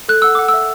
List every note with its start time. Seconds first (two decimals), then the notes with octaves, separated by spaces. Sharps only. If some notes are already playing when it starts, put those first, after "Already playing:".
0.09 A4 F#6
0.22 F#5 E6
0.35 F#5 D6
0.49 E6
0.54 E5